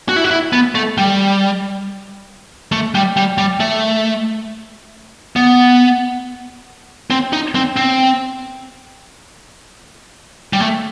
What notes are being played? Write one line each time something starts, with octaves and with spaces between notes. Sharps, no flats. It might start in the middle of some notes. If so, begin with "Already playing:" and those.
F#4
E4
F#4
E4
B3
A3
G3
A3
G3
G3
G3
A3
B3
C4
D#4
C4
C4
G3
A3